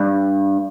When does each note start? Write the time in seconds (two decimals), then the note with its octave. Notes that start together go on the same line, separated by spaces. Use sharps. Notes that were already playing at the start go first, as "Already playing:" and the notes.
Already playing: G2